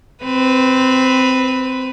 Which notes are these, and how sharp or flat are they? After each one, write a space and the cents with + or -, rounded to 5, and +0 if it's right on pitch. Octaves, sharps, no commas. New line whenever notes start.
C4 -10 B4 +10